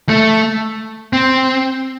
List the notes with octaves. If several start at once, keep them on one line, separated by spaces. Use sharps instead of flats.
A3
C4